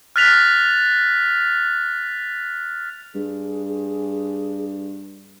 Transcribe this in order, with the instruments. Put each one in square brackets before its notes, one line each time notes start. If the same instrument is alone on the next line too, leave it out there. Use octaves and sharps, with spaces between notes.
[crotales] F6 F#6 A6 B6 F7
[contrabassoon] G2 [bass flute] G#4